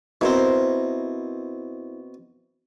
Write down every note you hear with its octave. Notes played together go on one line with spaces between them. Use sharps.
B2 C4 E4 A#4 C5